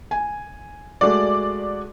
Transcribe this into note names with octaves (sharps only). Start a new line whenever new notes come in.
G#5
G#3 A3 F#4 D5